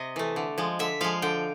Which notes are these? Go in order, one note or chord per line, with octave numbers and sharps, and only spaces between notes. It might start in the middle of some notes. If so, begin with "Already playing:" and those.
Already playing: C3 D#5
E3 A3
D3
F3 G#3
D3 E5
F3 G#3 F5
D3 G5